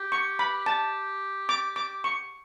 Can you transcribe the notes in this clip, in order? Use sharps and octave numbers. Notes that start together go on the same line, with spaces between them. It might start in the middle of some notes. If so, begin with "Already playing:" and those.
Already playing: G4
C#6
B5
A5
D6
D6
C#6